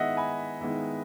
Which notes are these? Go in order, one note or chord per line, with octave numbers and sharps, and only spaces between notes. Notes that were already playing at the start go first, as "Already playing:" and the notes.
Already playing: D#3 G#3 B3 E4 D#5 E5 F#5
G#5 B5
D#3 G#3 B3 E4